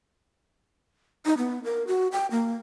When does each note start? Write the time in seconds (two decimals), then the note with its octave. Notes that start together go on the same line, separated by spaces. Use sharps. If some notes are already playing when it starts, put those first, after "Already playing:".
1.25 D#4
1.38 B3
1.64 A#4
1.87 F#4
2.12 G5
2.31 A#3